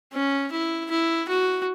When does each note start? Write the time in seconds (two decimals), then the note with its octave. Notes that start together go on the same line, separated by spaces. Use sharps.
0.13 C#4
0.52 E4
0.91 E4
1.29 F#4